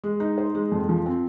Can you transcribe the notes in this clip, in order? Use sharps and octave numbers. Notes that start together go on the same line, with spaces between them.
G#3
D#4
C5
G#3
F2
F3
C4